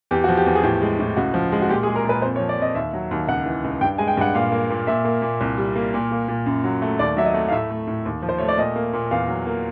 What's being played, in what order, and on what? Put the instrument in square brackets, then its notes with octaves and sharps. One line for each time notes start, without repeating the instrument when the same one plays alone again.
[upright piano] E2 G4
F3 F#4
G4
E2
G#4
A2 G4
G#3
A2
C#2 F#4
F3
G#3
F#4
A#2 G4
G#4
G#3
A#4
A#2 B4
F2 C5
C#5
F3
D5
F2 D#5
D#2 E5
F#3
D#2
C#2 F#5
E3
C#2
G2 G5
G#3 G#5
G5
G2 F#5
A#2 F5
A#3
A#2
A#2 E5
A#3
A#2
C2
G3
A#3
A#2
A#3
A#2
F#2
F#3
A3
D#2 D5
F#3 E5
D#5
A3
F5
A2 E5
A3
A2
D#2
F3
C5
A3 C#5
D5
A#2 D#5
A#3
A#2
E2 F5
F#3
A#3